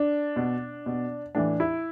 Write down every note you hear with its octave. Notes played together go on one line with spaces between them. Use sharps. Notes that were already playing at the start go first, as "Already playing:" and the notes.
Already playing: D4
B2
B2
A2 E3 D4
E4